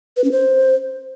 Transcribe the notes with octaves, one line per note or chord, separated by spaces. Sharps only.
B4
C#4
C5